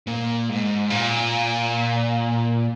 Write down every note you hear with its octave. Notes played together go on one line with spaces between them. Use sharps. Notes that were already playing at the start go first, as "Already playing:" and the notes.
A#2
G#2
A#2